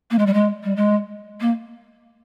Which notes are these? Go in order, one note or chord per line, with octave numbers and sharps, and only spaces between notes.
A#3
G#3
G3
G#3
G3
G#3
A#3